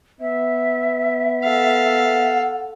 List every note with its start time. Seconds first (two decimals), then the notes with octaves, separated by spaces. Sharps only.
0.20 B3 E5
1.44 A4 F5 F#5